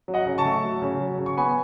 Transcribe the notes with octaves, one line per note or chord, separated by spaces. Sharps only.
F#3
D#5 F#5
C#3
A5 C#6
A3
F#3
C#3
F#3
C#3
C#6
B3 G#5 B5